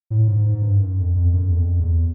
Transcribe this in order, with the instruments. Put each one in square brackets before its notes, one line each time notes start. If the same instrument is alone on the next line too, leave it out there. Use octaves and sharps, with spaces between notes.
[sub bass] A2
G#2
G#2
G2
F#2
F2
F2
F#2
E2
F2
E2